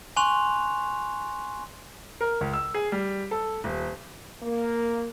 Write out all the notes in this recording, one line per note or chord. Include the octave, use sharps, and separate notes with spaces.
G#5 C6 C#6 F#6 F7
A#4
C#2
E6
G#4
G3
A4
D#1
A#3